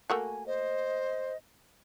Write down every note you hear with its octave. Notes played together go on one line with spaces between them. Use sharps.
A3 A#3 F#4 G#5
C5 D#5